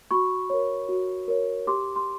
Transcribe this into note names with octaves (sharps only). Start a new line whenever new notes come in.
F#4 B5 C#6
A#4 C#5
F#4
A#4 C#5
G4 C6 D6
C6